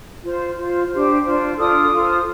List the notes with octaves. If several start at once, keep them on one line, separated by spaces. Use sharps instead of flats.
F4 C5
F4 C5
D4 G4 C5
D4 F4 C5
D4 F4 A4 D#6
F4 A4 C5